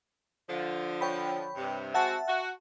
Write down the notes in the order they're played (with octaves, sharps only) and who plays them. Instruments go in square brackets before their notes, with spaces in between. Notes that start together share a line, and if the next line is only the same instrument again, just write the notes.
[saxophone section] D3 F3
[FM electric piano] C#5 G5 B5
[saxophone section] G2 C3
[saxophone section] G#3 C4 F#4 [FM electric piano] E5 F#5 A5
[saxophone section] F#4